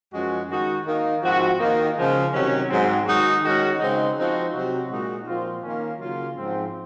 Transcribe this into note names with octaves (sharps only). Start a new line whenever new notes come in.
F#2 F3 G#3 C#4 F#4
D#3 G#3 D#4 F#4
D#3 A#3 D#4
G#2 F3 C4 F#4
D#3 A#3 D#4
C#3 F3 G#3
C3 D#3 F#3 C#4
G#2 F#3 C4
D#3 G#3 D#4 F#4
D#3 G#3 C#4 F#4
C#3 G#3 C4 D#4
F3 C4 D#4 F#4
C3 F#3 C4 F#4
A#2 G#3 D#4 F#4
A#2 F3 C4 F4
D#3 A#3 C#4
C#3 F#3 A#3 F4
G#2 F3 C4